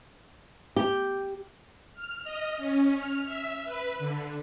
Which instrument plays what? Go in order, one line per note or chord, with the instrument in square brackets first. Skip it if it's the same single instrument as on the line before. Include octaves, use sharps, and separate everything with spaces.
[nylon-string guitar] G4
[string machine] F6
D#5
C#4
F6
E5
B4
D3